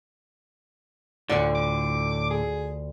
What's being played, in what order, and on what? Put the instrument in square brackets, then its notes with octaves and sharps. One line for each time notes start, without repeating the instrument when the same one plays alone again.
[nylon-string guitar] D2 F4 D5 [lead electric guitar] A2 D3 [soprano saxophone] F#5
[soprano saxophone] D6
G#4